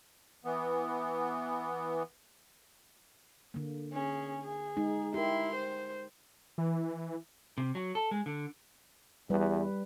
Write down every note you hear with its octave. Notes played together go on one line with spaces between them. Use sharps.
E3 B3
D3 A#3
C#4 G#4
G#4
G#3 D#4
E4 G4 A#4 C6
C5
E3
C3
F#3
A4
G#3
D3
E2 G3 B4